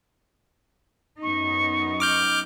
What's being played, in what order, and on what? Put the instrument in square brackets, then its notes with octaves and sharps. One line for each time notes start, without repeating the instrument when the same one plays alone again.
[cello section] F#2 B3 D#4 [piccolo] C#6
[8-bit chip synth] D6 F6 G6